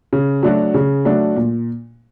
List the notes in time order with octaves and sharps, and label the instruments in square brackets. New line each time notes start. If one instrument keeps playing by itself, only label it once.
[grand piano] C#3
F#3 A3 D4 F#4
C#3
F#3 A3 D4 F#4
A#2